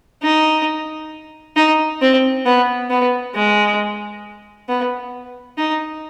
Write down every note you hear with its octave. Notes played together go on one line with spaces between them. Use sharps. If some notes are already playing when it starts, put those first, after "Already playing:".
D#4
D#4
C4
B3
B3
G#3
B3
D#4